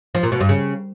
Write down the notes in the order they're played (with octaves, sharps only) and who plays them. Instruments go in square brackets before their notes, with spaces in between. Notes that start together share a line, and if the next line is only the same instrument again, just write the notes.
[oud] F3
A#2
B2
G2
C#3